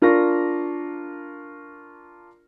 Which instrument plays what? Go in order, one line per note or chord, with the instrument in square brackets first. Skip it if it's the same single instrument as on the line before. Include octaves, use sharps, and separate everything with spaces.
[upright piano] D4 F4 A#4 C#6 A#6